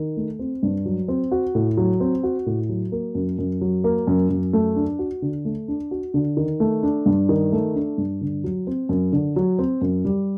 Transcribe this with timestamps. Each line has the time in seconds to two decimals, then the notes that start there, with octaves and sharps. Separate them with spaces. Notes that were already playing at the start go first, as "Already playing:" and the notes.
Already playing: D#3
0.17 A3
0.39 C4
0.63 G2
0.85 F#3
1.08 C4
1.32 F#4
1.55 A2
1.77 F#3
2.00 C4
2.23 F#4
2.46 A2
2.69 F#3
2.92 A#3
3.15 F#2
3.38 F#2
3.61 F#3
3.84 A#3
4.07 F#2
4.30 F#2
4.53 A3
4.76 D4
4.99 F#4
5.22 D3
5.45 A3
5.68 D4
5.91 F#4
6.14 D3
6.37 D#3
6.60 A3
6.83 D4
7.06 G2
7.29 D#3
7.52 A3
7.75 D4
7.98 G2
8.21 D3
8.44 F#3
8.67 C4
8.89 F#2
9.13 D3
9.36 F#3
9.59 C4
9.81 F#2
10.05 G3